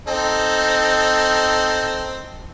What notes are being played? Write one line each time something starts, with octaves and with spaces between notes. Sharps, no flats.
C4 D#4 A4